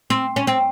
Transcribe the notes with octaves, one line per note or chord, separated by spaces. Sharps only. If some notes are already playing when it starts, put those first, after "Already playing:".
C4
C#4
C4